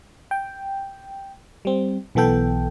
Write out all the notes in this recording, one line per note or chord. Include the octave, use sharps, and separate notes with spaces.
G5
G3 C4
B1 E3 B3 A4 G5